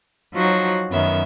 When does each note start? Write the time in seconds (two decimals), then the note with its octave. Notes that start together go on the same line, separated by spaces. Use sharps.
0.34 F3 F#3 D#4 F#4 C5 C#5
0.91 F#2 D#3 B3 C#4 E5